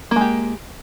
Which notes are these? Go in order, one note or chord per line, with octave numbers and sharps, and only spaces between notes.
G#3 A#3 G4